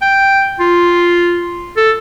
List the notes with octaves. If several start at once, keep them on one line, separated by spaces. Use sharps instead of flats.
G5
F4
A4